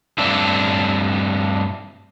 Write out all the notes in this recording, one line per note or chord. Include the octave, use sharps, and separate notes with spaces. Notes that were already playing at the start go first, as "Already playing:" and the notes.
G2 A3 C4 D4 A4